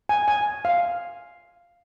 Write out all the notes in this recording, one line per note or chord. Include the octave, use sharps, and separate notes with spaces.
G#5
G#5
F5